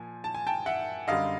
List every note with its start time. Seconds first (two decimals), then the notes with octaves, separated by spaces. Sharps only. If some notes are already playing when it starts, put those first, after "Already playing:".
Already playing: A#2 F3 G#5
0.24 A5
0.35 G#5
0.47 G5 A5
0.66 E5 F#5
1.08 F#2 D3 G3 D#5 F5